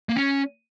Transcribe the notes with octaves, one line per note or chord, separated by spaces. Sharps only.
A#3
C#4